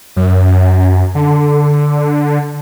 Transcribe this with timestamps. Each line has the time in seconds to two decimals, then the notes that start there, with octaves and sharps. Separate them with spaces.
0.16 F#2
1.15 D3